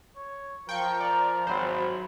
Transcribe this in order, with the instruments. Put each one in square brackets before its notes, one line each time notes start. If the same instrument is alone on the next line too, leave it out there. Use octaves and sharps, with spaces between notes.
[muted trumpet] C#5
[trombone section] F3 [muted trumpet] A#4 [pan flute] F5 [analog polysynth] G5 C#6
[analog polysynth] D5 [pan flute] A#5
[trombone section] G#1 [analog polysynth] F#3 C5 [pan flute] B5